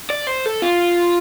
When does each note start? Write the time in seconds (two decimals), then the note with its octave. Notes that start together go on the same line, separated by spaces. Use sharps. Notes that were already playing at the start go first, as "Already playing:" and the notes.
0.10 D5
0.27 C5
0.46 A4
0.62 F4